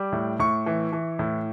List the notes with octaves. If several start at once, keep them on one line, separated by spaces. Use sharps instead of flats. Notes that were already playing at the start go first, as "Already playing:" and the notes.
Already playing: G3 D6
A2
A2 C#6
E3
E3
A2